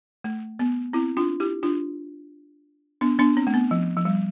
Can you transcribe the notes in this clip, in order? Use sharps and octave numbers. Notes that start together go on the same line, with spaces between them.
A3
B3
C4 E4
D4 F4
E4 G4
D4 F4
B3 D4
B3 D4
C4
A3
B3
F3
F3
G3